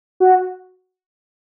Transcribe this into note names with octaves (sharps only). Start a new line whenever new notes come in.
F#4